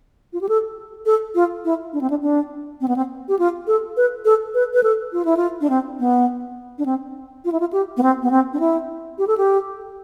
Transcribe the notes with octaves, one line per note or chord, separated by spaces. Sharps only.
F4
G4
A4
A4
F4
E4
D4
C4
D4
D4
C4
B3
C4
G4
F4
A4
B4
A4
B4
B4
A4
F4
E4
F4
D4
C4
B3
D4
C4
F4
E4
F4
G4
B3
C4
B3
C4
D4
E4
G4
A4
G4